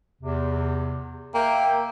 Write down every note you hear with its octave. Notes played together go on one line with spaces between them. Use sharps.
E2 C3
A#3 E5 G5